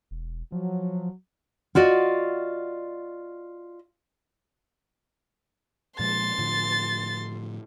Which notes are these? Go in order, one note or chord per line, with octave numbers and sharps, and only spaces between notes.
E1
F3 F#3
F4 F#4 D5 D#5
A#2 F3 G#3 C6 A6
A2 D3 F3